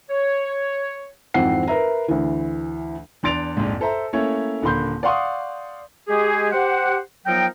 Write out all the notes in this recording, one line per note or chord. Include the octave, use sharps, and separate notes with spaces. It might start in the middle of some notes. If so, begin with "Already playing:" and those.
C#5
G#1 F2 E3 C4 F#5 C7
A#4 B4 E5 A#5
D2 E3
E2 D4 C6 A6 D7 F7
A#1 F2 G#2
A4 C5 E5 A#5
A3 A#3 C#4 E4 C#5
D#1 D3 A#3 B5 C6 G6
D5 F5 F#5 C6 C#6 D#6
G#3 G4 G#4
G4 C5 F#5
F3 F#3 B3 D#4 A#4 G5